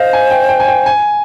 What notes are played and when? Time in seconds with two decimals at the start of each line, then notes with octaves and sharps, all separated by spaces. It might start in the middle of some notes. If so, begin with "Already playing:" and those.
Already playing: C5 D#5 F5
0.13 G#5
0.31 G5
0.49 G5
0.60 G#5
0.68 G5
0.86 G#5